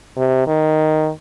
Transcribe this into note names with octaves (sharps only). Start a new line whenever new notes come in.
C3
D#3